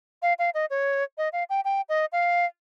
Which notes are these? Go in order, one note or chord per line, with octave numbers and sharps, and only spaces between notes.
F5
F5
D#5
C#5
D#5
F5
G5
G5
D#5
F5